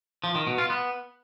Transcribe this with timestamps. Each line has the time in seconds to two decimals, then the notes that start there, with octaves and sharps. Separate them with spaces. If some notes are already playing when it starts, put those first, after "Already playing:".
0.24 F3
0.35 D#3
0.47 B2
0.58 F4
0.70 B3